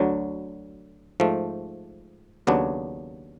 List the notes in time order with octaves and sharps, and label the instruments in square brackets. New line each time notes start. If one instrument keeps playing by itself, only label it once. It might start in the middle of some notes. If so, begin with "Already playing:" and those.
Already playing: [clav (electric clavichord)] D2 D3 F#3
G#2 F3 A3
D#2 C#3 F#3 B3 D4